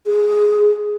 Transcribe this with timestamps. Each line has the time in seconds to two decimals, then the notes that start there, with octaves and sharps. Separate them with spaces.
0.06 G#4